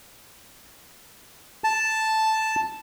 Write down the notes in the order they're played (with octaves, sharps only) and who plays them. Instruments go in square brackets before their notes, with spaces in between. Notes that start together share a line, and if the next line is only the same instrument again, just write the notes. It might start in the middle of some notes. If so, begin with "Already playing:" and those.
[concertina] A5